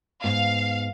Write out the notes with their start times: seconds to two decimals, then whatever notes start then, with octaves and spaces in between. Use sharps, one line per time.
0.24 G#2 B3 F5